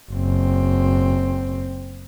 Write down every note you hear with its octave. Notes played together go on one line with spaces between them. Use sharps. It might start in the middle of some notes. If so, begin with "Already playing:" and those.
F#1 C4